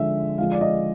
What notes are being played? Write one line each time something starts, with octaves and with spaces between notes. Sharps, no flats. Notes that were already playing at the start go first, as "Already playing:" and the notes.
Already playing: D3 F3 G#3 E5
D3 F3 G#3 F5
D5
D#5